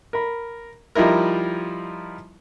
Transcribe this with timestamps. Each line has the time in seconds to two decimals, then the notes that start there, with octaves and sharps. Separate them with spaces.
0.13 A#4 B5
0.95 F3 G3 D#4 E4 A#4